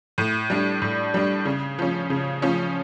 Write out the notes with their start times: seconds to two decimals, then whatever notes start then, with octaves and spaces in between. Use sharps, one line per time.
0.18 A2
0.50 G3 D4
0.82 A2
1.14 G3 D4
1.45 C#3
1.79 F3 C#4
2.10 C#3
2.42 F3 C#4